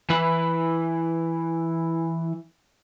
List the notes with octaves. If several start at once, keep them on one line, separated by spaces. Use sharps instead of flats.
E3 E4 B4